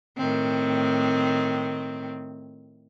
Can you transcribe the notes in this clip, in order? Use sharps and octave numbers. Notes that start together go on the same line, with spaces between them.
A2 D#3 C4